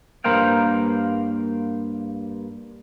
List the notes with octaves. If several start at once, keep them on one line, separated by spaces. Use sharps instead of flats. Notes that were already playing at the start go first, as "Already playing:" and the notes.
G2 A#3 A#4 C5 F5 G5